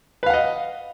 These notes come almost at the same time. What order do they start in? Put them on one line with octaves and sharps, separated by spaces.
B4 F5 F#5 D#5